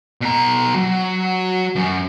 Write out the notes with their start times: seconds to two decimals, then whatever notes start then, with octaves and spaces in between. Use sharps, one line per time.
0.21 B2 A#5
0.75 F#3
1.76 F#2